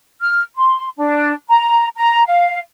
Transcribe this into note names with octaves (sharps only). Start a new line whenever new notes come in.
F6
C6
D4
A#5
A#5
F5